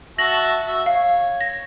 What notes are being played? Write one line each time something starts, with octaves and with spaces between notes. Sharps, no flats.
F#4 E5 A5 A#6 F#7
F#4 E5
C#5 F5
A#6